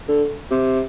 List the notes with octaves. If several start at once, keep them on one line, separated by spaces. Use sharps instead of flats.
D3
C3